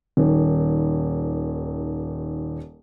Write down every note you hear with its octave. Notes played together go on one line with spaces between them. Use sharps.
D#1 D#2